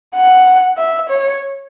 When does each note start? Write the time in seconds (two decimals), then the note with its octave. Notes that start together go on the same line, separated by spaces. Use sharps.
0.15 F#5
0.77 E5
1.10 C#5